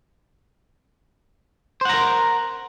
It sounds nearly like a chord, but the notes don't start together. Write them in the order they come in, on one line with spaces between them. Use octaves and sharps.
C5 F#5 A#5 A#4